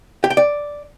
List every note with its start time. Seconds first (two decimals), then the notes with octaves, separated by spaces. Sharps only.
0.24 G4
0.30 G5
0.37 D5